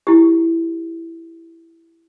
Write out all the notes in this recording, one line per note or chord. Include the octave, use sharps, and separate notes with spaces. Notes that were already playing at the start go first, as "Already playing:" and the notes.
E4 G4